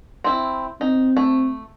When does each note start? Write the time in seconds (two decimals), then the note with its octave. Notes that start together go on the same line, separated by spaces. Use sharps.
0.24 C4 E4
0.81 C4 D#4
1.17 A3